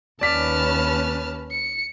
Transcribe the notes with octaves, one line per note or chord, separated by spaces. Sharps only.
D#2 C#4 B4 D5 A5 F6 B6
C#7